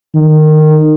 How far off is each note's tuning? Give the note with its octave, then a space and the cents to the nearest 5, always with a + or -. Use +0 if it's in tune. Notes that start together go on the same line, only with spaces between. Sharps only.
D#3 -20